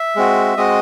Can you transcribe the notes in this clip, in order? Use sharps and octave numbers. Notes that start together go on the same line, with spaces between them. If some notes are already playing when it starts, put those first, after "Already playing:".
Already playing: E5
G#3 C4 F#4
G#3 C4 F#4 D#5